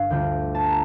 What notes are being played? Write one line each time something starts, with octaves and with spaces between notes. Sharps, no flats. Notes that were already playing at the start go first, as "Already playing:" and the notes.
Already playing: G1 G2 F5
D2 D3 G3 D4 F4 G5
A5
A#5